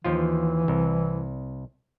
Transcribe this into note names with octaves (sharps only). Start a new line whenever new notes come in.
D#2 E3 F3 F4
C2